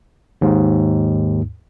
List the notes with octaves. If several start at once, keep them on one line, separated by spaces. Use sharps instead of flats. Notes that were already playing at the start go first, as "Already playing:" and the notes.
D#2 G#2